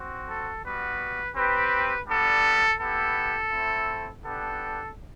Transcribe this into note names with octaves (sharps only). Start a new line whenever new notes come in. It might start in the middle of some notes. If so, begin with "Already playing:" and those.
Already playing: C4 F#4
A4
G3 B3 F#4 B4
C4 G4 B4
G3 B3 D4 A4
B3 E4 G4 A4
A3 C4 E4
B3 D4 G4 A4